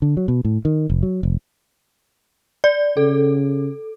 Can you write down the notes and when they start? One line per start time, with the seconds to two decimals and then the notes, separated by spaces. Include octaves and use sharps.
0.02 D3
0.17 F#3
0.28 B2
0.45 A2
0.65 D#3
0.90 F1
1.03 F#3
1.23 F1
2.64 D5
2.97 C#3 A4